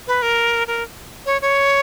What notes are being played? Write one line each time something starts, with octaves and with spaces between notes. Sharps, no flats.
B4
A#4
A#4
C#5
C#5